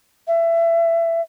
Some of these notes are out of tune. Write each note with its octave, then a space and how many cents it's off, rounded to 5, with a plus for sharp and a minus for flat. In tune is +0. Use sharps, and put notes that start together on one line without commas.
E5 +25